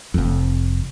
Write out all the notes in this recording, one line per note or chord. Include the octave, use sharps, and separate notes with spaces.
F1 F2